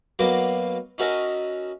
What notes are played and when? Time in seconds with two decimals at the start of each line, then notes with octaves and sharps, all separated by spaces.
0.19 B2 F#3 A#3 D6
0.98 C#4 D#4 F#4 A#4 E5 A5